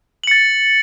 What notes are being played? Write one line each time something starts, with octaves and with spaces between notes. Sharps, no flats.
A6 C#7 F#7